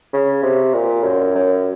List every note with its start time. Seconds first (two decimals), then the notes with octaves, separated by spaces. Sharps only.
0.13 C#3
0.43 C3
0.74 A#2
1.04 F#2
1.35 F#2